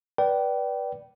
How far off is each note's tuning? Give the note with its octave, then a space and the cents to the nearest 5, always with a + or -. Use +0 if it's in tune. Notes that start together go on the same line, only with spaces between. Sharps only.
B4 -15 D5 +0 G5 -25